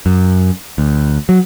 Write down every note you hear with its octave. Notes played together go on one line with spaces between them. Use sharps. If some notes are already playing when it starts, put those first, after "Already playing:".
F#2
D2
F#3